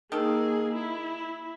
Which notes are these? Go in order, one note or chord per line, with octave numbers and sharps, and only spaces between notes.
D#3 A#3 G#4 A4
E4